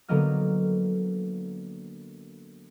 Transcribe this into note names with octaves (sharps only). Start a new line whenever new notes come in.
D3 F#3 A#3 B3 D#5 F6